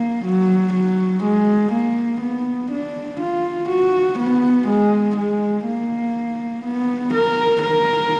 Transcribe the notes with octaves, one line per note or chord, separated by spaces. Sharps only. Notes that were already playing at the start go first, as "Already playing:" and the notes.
Already playing: A#3
F#3
F#3
G#3
A#3
B3
D4
F4
F#4
B3
G#3
G#3
A#3
B3
A#4
A#4